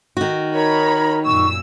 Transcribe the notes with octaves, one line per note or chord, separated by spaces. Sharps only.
D#3 F#4
D#4 A#4 C#5 B5
F#2 A#2 C#6 E6